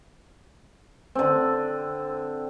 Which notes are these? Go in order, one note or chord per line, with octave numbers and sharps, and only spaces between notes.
D3 C4